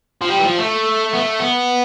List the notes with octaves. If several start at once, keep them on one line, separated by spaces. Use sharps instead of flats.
F3
G3
E3
F3
A3
B3
A3
B3